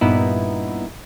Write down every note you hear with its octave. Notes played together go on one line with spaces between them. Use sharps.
G2 A#2 B3 D#4 E4